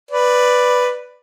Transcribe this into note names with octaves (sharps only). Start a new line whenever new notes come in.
B4 D5